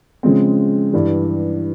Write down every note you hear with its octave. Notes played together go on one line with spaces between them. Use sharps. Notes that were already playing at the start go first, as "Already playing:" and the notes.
C#3 F3 G#3 C4
G2 E3 G3